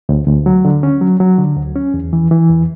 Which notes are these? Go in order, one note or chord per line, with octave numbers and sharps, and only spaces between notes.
D2
D2
F#3
D3
C#4
F#3
F#3
D3
D2
C#4
E2
E3
E3
E2